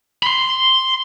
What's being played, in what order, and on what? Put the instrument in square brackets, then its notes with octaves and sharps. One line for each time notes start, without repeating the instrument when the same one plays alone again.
[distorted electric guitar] B5 C6